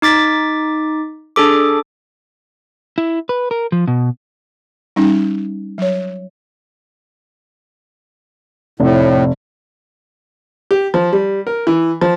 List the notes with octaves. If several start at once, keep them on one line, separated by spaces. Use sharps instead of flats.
D#4 D6 A6 B6
D4 G#4 A4 D6
E4
B4
A#4
F3
B2
G3 C#4 D#4
F#3 C#5
F1 A2
G4
F3
G3
A#4
E3
F3